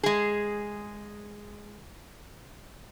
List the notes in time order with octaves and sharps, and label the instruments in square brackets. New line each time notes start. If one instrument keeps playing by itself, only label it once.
[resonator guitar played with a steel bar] G#3 G#4